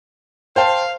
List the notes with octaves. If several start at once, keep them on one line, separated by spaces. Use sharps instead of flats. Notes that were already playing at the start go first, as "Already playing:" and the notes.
C5 F5 G5 A5